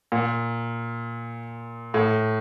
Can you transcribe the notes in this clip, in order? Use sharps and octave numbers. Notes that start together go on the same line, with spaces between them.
A#2
A2